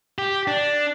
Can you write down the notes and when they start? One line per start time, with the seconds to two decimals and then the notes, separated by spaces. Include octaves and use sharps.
0.18 G4
0.47 D4